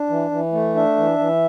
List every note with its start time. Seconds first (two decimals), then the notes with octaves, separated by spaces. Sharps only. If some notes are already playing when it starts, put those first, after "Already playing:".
Already playing: D4
0.10 E3
0.31 E3
0.53 A3
0.75 D4 E5
0.97 E3
1.19 E3